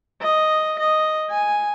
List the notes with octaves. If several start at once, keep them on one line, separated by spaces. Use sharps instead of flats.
D#5
D#5
G#5